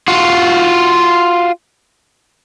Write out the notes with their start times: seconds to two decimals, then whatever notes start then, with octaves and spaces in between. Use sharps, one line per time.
0.08 F4 F#4